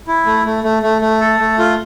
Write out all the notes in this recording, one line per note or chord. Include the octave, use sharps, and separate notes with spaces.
E4
A3
A3
A3
A3
A3
A4
A3
F4